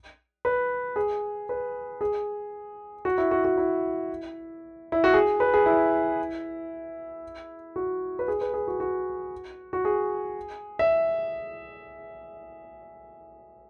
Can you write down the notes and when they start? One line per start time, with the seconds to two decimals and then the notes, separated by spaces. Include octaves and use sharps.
0.45 B4
0.96 G#4
1.49 B4
2.01 G#4
3.05 F#4
3.18 E4
3.31 F#4
3.45 F#4
3.58 E4
4.92 E4
5.04 F#4
5.14 G#4
5.40 B4
5.54 G#4
5.66 E4
7.76 F#4
8.19 B4
8.28 G#4
8.41 B4
8.54 G#4
8.68 F#4
8.80 F#4
9.73 F#4
9.85 G#4
10.79 E5